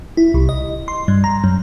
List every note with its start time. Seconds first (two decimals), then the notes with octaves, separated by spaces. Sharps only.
0.17 E4
0.34 C2
0.49 D#5
0.88 C6
1.08 G2
1.24 A#5
1.44 F#2